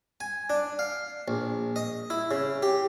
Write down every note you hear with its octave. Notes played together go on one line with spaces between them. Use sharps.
G#5
D4
F5
A#1
D#5
E4
C#3
G4